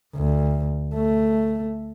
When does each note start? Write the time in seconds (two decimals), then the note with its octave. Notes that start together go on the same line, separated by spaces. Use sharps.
0.15 D2
0.95 A3